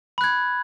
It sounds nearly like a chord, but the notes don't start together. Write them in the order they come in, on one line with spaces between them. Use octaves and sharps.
B5 F#6 G#6